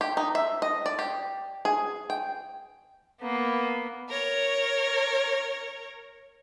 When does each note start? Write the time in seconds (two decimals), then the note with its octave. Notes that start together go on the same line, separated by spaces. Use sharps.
0.01 G4
0.17 D#4
0.35 E5
0.62 D#5
0.86 D5
0.99 G4
1.65 G#4
2.10 G5
3.21 A#3 B3
4.09 A#4 C#5